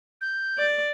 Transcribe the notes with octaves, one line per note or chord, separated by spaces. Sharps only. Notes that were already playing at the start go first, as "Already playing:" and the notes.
G6
D5